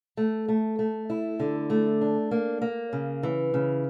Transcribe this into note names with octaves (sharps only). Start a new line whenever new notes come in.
A3
A3
A3
E4
D3
A3
D4
A#3
A#3
C#3
E3
C#3